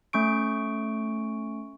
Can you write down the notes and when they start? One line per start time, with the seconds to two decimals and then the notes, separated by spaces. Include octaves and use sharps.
0.13 A3 C#4 C#6 D7